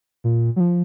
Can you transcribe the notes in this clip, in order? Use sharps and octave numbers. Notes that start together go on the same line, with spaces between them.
A#2
F#3
F3